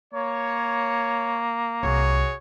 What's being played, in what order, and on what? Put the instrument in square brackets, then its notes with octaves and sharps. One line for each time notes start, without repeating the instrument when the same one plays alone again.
[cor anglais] A#3 [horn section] C#5
[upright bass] C2 [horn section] F#4 G#4 C#5